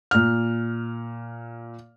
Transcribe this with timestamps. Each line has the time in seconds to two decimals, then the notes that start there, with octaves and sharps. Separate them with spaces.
0.11 A#2 F6